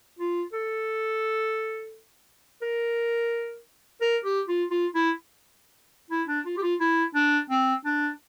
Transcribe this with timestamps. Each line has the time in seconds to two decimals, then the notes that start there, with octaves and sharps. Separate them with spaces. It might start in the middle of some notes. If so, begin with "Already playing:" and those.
0.19 F4
0.53 A4
2.62 A#4
4.01 A#4
4.24 G4
4.48 F4
4.71 F4
4.94 E4
6.10 E4
6.28 D4
6.46 F4
6.57 G4
6.62 F4
6.80 E4
7.15 D4
7.50 C4
7.85 D4